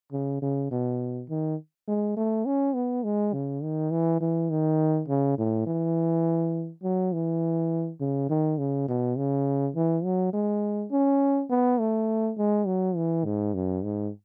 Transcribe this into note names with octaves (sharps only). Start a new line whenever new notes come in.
C#3
C#3
B2
D#3
G#3
A3
C#4
B3
G#3
C#3
D#3
E3
E3
D#3
C#3
A2
E3
F#3
E3
C#3
D#3
C#3
B2
C#3
E3
F#3
G#3
C#4
B3
A3
G#3
F#3
E3
G#2
F#2
G#2